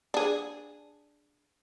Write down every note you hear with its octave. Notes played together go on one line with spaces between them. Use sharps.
D4 G#4